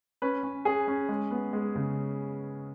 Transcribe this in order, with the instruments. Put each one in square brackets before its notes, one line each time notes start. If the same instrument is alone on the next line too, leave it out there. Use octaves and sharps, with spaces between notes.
[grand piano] C#4 B4
C#4
C#4 G#4
C#4
G#3
B3
G#3
C#3